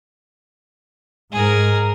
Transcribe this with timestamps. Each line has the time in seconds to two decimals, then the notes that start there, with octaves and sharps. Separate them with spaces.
1.32 G#2 G#4 A#4